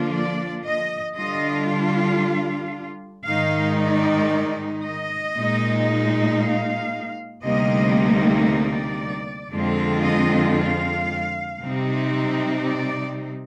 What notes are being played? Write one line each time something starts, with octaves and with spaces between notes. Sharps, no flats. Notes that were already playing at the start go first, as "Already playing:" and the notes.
Already playing: D3 F3 A#3 D4 F4
D5
D#5
D3 G3 D4 F4 D#5
F5
G#2 D#3 G#3 D#4 F5
D5
D#5
A#2 G#3 D#4
F5
D2 C3 G3 A#3 D#4 D#5
D5
F2 D3 G#3 C4 F4
D#5
F5
C3 G3 C4 D#4
D5